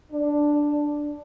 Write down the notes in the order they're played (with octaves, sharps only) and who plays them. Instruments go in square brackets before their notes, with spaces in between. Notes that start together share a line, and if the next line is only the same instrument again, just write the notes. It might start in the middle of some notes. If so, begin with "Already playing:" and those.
[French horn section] D4